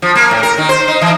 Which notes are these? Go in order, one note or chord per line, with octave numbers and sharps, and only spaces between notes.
F3
A#3
A2
A#4
D#3
C5
D#4
E3